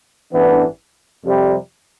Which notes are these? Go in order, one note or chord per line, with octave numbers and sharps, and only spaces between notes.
A1 G2 E3 B3 D4
F2 C3 G3